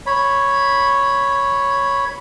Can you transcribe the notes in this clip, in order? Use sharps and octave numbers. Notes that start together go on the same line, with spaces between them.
C#5 B5